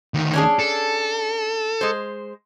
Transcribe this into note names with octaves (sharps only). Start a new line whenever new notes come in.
D2 D#3
C#4 D4 G#4
A4
G#3 C5